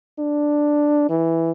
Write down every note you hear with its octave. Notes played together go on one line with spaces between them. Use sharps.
D4
E3